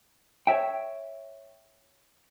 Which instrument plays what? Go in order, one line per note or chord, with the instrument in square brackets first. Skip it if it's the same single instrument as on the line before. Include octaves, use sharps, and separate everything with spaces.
[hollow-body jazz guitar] C#5 D5 E5 G5